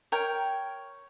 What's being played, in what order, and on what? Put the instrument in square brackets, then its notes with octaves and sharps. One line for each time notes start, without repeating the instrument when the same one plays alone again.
[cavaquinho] A#4 C#5 G5